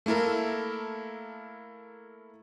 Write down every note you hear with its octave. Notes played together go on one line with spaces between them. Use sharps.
A3 A#3 E4 A4 A#4